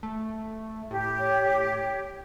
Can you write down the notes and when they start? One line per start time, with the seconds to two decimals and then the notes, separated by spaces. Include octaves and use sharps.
0.03 A3
0.91 A2 G4
1.19 C#5